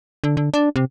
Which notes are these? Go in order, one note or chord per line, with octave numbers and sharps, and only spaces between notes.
D3
D3
D4
C3